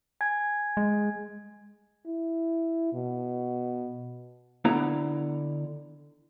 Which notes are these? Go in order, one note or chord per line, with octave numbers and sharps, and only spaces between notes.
G#5 G#6
G#3
E4
B2
D3 B3 E4 A#5